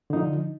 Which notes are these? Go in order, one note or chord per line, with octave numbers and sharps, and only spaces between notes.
D3 F3 D#4